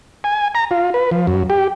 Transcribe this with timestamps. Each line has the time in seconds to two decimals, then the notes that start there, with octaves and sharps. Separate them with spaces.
0.24 G#5
0.55 A#5
0.71 F4
0.94 B4
1.11 F3
1.27 F#2
1.50 G4